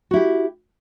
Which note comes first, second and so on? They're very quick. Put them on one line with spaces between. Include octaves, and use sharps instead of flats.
F#4 E4 G4